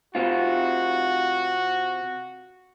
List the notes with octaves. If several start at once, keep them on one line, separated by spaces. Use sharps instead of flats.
C3 C4 F4 F#4